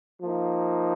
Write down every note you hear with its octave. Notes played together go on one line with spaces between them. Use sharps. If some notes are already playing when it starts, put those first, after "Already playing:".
F3 A#3 D#4